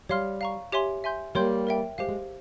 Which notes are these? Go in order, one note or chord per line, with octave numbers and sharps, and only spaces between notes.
G3 C#5 F5 C6 F6
F5 A#5 C#6
G4 C#5 E5 G#5 C6
E5 G#5 C6 G6
G3 A#3 A#4 C#5 G5 C6 G6
A#4 E5 G5
G#3 G4 C5 F5
G#3